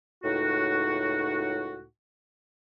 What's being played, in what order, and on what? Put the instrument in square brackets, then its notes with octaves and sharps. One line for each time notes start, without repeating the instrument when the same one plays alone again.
[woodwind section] C#2 A2 D#4 F#4